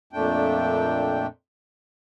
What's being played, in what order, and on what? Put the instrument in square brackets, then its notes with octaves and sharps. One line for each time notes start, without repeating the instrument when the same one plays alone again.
[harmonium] F2 A#2 A3 D4 G5